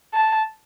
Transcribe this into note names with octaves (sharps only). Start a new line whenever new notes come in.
A5